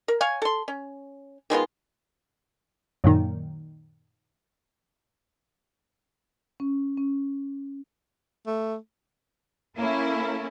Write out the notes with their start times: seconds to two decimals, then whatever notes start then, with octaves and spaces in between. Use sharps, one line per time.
0.08 A#4
0.21 C#5 F5 G#5
0.42 A4 C6
0.68 C#4
1.50 D#3 G#3 B3 F4
3.04 F#2 A#2 D#3
6.60 C#4
6.97 C#4
8.47 A3
9.78 A#3 C#4 E4 A4